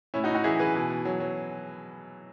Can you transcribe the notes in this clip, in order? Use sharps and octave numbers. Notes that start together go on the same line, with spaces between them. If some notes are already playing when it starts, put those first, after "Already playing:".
A2 C#4 E4
D#4 F#4
A2
D#4 F#4
E3 E4 G#4
E3 G#4 B4
B2
B2
F#3
F#3